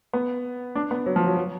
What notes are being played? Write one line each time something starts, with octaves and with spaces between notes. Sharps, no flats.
B3
D4
B3
F#3
F3
F#3
F#3